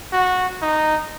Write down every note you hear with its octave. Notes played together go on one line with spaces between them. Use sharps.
F#4
D#4